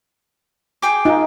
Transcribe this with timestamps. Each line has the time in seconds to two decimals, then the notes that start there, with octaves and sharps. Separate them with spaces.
0.82 G#4 G5 D6
1.05 D#4 F4